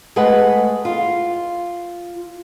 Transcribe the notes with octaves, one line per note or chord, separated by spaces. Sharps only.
G#3 A3 G#4 B4 F#5
F4